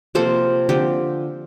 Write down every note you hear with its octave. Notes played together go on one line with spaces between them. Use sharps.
C3 F3 A#3 A4 C5
D3 F3 C4 G4